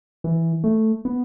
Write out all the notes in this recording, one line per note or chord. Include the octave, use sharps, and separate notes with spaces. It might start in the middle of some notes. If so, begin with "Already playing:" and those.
E3
A3
B3